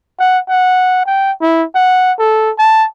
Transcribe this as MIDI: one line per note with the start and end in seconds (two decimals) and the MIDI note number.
0.19 0.39 78
0.49 1.02 78
1.06 1.32 79
1.41 1.64 64
1.75 2.12 78
2.19 2.51 69
2.59 2.86 81